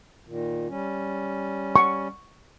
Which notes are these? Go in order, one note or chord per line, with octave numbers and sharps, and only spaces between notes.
A#2 D#3
G3 C#4
C#6